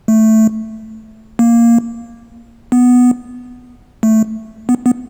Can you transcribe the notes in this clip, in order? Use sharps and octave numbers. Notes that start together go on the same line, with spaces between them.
A3
A#3
B3
A3
B3
B3